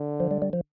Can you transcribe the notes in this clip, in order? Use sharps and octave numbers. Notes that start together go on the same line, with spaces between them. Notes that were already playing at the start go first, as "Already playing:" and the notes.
Already playing: D3
F3
G3
G3
F3